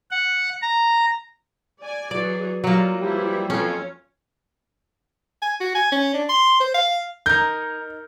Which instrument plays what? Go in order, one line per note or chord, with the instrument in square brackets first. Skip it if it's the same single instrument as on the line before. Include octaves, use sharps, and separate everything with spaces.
[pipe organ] F#5
A#5
[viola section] D5 G#5
[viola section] E3 F#3 G#4 [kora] D5
[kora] F#3 A#3 [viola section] G3 F4
[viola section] E3 E4 [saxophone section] F3 G3
[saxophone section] F2 [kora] C#4 [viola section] F4 C#5
[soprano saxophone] G#5
F#4
G#5
C#4
D4
C6
C5
F5
[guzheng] D#4 A#4 [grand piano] G6